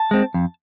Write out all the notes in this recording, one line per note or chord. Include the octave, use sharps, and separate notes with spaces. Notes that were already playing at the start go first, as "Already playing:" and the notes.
Already playing: A5
G#3 C4
F2